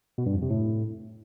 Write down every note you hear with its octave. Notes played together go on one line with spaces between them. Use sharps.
B2
G2
F2
C3
A2